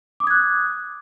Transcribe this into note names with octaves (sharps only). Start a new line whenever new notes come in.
D6 D#6 F#6 G#6